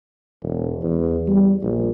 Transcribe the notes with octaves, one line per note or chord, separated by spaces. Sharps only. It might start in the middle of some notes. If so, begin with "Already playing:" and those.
E1
E2
G3
A#1